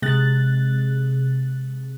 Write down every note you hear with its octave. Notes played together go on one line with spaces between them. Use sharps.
C3 G#3 F#6 A6